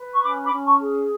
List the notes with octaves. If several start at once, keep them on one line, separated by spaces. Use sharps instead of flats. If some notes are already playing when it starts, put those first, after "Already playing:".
Already playing: B4
C#6
C#4 B5 D6
B5 D6
C#4
A5 C#6
G#4